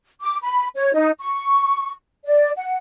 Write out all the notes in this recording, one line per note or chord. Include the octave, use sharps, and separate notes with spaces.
D6
B5
C#5
D#4
C#6
D5
F#5